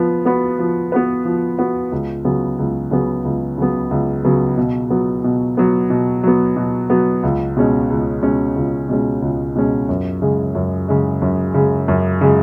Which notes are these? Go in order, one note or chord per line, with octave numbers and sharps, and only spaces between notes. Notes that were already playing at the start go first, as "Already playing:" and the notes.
Already playing: F3 B3 B4
B3 F#4 B4
F3
B3 F#4 B4
F3
B3 F#4 B4
C#2
C#3 F#3 B3
C#2
C#3 F#3 B3
C#2
C#3 F#3 B3
C#2
C#3 F#3 B3
B2
F#3 B3
B2
F#3 B3
B2
F#3 B3
B2
F#3 B3
C#2
B2 G#3 C#4
C#2
B2 G#3 C#4
C#2
B2 G#3 C#4
C#2
B2 G#3 C#4
F#2
C#3 G#3
F#2
C#3 G#3
F#2
C#3 G#3
F#2
C#3 G#3